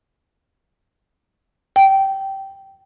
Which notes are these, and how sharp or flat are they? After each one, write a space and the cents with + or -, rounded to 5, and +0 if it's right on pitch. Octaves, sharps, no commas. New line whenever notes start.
G5 -15